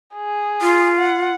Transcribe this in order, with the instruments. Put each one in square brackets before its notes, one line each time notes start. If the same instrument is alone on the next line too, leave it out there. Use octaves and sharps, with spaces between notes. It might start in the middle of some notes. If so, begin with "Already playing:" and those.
[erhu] G#4
[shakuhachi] F4
[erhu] F#5